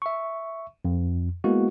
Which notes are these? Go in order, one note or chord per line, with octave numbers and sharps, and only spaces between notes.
E5 C#6
F2
G#3 A#3 B3 E4 F#4